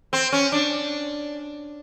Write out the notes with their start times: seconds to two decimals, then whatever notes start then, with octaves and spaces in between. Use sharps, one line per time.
0.13 C4
0.32 C#4
0.52 D4